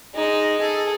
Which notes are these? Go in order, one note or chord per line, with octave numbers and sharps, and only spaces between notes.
G#3 D#4
G#4 A4